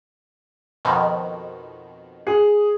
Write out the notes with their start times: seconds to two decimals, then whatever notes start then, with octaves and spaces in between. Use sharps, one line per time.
0.85 F2 B2 D#3
2.27 G#4